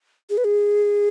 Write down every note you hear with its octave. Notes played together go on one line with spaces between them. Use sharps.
G#4
B4
G#4